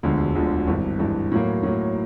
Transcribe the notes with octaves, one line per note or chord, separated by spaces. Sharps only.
E1 D2 D3 F3 G#3
E1 D2 D3 F3 G#3
G#1 G2 E3
G#1 G2 E3
A2 F#3 A#3
A2 F#3 A#3